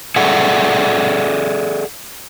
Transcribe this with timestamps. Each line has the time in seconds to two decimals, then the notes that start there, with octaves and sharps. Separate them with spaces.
0.16 G#4 A4 D5 E5 F#5